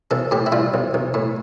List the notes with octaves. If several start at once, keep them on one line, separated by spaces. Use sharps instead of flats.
B1 A4
A2 G4
E4
G3 F4
B1
B1
A2